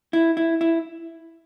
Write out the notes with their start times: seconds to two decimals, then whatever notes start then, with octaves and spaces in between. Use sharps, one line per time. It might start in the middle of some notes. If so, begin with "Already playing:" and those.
0.13 E4
0.37 E4
0.61 E4